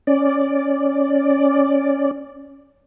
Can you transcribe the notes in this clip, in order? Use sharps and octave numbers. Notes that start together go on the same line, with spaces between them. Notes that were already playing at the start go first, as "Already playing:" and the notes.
C#4 D5